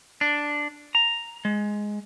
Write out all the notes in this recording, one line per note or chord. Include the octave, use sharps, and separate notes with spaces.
D4
A#5
G#3